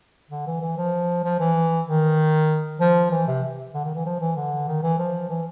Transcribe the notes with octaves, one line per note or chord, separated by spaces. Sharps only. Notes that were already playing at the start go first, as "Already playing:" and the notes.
D3
E3
E3
F3
F3
E3
D#3
F3
E3
C3
D3
D#3
E3
F3
E3
D3
D#3
E3
F3
E3